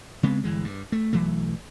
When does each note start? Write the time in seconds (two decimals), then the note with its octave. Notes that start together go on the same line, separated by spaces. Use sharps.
0.23 C#3 G#3 B3 C4
0.44 G1 E3 G#3
0.65 G2
0.92 A3
1.13 B1 E3 F#3 A3